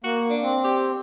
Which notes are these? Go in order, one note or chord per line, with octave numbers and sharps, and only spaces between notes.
A#3 F#4
D4
C4
G4